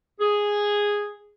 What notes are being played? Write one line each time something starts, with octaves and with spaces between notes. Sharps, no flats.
G#4